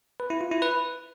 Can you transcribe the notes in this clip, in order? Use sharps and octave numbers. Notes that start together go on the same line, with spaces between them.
B4
E4
F4
E4
B4